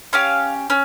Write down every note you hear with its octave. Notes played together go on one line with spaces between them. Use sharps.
C#4 G4 F5
C#4